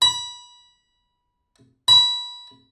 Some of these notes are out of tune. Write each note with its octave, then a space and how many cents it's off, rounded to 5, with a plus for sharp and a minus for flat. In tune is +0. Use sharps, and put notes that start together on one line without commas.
B5 -20
B5 -15